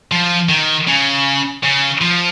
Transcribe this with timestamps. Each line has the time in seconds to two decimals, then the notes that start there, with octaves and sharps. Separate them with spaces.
0.11 F3
0.49 D#3
0.87 C#3
1.63 C#3
2.01 F3